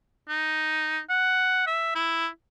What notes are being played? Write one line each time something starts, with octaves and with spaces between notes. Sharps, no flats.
D#4
F#5
E5
E4